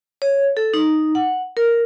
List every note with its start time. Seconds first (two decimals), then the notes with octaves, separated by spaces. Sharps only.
0.22 C#5
0.57 A4
0.74 D#4
1.15 F#5
1.57 A#4